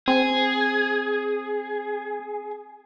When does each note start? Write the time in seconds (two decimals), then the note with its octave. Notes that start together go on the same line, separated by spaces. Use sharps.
0.08 C4 G#4